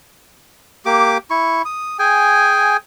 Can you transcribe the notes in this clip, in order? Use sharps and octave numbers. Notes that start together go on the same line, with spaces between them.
A#3 G4 D6
E4 C#6
D#6
G#4 G5 G#5